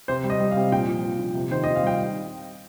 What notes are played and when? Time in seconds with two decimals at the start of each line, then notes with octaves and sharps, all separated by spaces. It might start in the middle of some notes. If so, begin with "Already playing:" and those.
0.08 C3 C5
0.24 G3
0.30 D#5
0.40 G3
0.51 F5
0.57 C3
0.72 A#2 G5
0.87 F3
1.03 F3
1.19 A#2
1.35 C3
1.51 D#3 C5
1.64 C3 D#5
1.75 F5
1.83 G3 G5